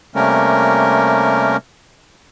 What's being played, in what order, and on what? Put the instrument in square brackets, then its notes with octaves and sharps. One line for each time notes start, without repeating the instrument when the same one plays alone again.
[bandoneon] C3 G3 A3 A#3 C#4 A#4